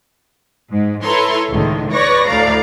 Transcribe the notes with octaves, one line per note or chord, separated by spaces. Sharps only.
G#2
E4 A4 B4 C#5 A#5 C6
C#2 A2 D3 D#3
B4 C#5 D5 C#6 A#6
D2 A2 D5 F5 A#5